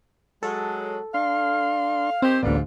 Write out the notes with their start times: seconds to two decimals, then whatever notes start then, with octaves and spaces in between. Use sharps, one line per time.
0.43 F#3 G#3 A4
1.14 D4 F5 C6
2.22 D#3 C4 G4 C5
2.43 A1 D2 G#2 A#3 B3 F4 D5